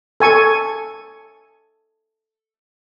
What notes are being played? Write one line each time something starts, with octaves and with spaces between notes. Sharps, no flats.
A4 G#5 C#6